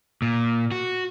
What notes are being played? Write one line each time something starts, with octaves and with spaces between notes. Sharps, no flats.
A#2
F#4